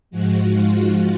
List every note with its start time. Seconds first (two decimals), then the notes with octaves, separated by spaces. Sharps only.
0.11 G#2 F3 G#3 F#4
0.50 F4